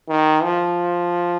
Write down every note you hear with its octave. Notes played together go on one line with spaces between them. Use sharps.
D#3
F3